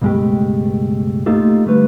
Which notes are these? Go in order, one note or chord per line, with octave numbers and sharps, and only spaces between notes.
C#2 G2 B2 G#3 A3 G4
A3 A#3 D#4 F4 G4 A4
D3 G3 A3 B4